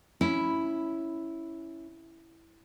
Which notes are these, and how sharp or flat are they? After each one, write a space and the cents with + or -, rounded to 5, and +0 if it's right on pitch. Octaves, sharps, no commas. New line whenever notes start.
C#4 +5 E4 +0